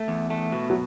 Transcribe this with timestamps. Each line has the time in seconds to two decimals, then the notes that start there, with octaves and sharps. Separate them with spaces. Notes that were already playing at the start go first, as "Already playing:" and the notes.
Already playing: A3
0.08 E2
0.30 A3
0.52 B2
0.70 F#3